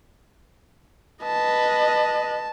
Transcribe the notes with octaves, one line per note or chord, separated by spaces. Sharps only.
B4 D#5 A5